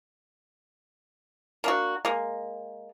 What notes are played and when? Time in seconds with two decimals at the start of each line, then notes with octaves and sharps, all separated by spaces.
1.64 A#3 D4 F#4
2.05 G#3 A#3